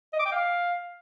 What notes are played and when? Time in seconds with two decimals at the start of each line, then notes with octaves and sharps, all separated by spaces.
0.13 D#5
0.19 D6
0.26 G5
0.32 F5